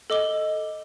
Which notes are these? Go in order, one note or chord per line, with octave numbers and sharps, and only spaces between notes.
A4 D#5 D6 G7